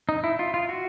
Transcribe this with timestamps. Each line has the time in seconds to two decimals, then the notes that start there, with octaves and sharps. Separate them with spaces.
0.09 D#4
0.24 E4
0.39 F4
0.54 F4
0.69 F#4